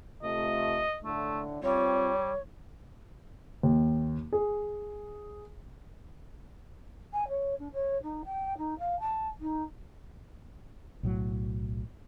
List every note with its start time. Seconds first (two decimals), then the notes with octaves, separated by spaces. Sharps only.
0.23 C3 A3 F4 D#5
1.04 A2 D3 A3 D4
1.62 G3 C4 F4 C#5
3.63 D#2
4.33 G#4
7.13 G#5
7.28 C#5
7.59 D4
7.73 C#5
8.03 D#4
8.25 G5
8.58 D#4
8.79 F5
9.00 A5
9.40 D#4
11.03 B1 A2 F#3